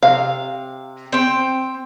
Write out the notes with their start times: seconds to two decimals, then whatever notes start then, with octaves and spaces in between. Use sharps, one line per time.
0.03 C3 F5
1.12 C4 G5